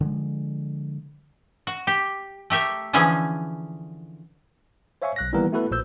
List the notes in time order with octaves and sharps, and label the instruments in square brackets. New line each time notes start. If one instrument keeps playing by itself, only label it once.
[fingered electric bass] D3 F3 G#3
[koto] F#4
G4
A3 G4 A#4 E5
D3 E3 F3 C#4 G#4
[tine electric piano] C5 C#5 E5 F5 G#5 C#6
B1 F#6 A#6
D#3 E3 G3 A#3 B3 A#4
A3 B3 E4 F#4 A4 B4
A#1 A#2 C5 E6 G6